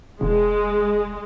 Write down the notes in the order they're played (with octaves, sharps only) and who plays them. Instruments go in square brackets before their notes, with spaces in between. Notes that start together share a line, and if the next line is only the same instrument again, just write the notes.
[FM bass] E1 [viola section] G#3